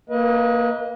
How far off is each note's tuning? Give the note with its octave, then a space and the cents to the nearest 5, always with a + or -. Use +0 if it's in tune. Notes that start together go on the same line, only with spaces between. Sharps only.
A#3 +0 B4 -25 D#5 +20